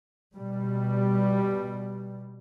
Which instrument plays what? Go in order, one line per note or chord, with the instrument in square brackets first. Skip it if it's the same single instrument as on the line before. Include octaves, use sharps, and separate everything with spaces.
[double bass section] B2 G3